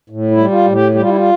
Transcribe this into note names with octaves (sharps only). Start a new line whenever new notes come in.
A2
E4
G3
F4
A2
G4
G3 G4
F4
E4
F4